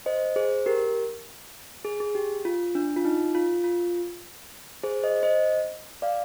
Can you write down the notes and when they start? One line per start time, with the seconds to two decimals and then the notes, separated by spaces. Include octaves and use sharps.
0.06 C5 D#5
0.36 G#4 C5
0.66 G4 A#4
1.85 G#4
2.00 G#4
2.15 G4
2.45 F4
2.75 D4
2.96 F4
3.05 D#4
3.35 F4
3.64 F4
4.84 G#4 C5
5.03 C5 D#5
5.23 C5 D#5
6.02 D5 F5